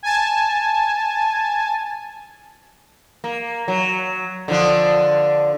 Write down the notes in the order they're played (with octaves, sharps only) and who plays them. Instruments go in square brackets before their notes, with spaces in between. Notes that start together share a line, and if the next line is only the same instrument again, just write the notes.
[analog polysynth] G#5 A5
[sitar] A#3
F#3
D3 F3 D4